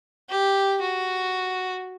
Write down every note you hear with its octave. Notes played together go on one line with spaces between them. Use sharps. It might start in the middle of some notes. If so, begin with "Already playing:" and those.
G4
F#4